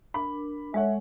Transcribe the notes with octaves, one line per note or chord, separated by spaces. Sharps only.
D4 A#4 B5 D6
G#3 A4 C#5 E5 F#5